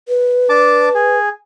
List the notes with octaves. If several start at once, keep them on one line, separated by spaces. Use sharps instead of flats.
B4
D4 A5 D6
G#4